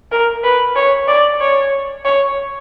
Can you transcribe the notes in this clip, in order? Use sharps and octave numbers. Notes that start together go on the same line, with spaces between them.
A#4
B4
C#5
D5
C#5
C#5